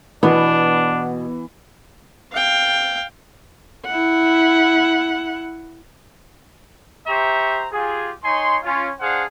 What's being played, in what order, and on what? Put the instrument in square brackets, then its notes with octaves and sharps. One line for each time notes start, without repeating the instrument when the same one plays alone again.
[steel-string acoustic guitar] B2 [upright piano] E3 [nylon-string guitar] B3 [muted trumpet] D4
[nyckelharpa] F5 G5
[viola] E4 F#5
[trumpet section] G4 C5 E5 A#5 C#6
F4 G4 G#4
D#4 C#5 G#5 C6
C#4 F4
D4 G#4 C5 F5 F#5